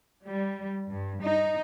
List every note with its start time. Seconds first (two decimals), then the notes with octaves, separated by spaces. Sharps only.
0.24 G3
0.89 G2
1.21 D#4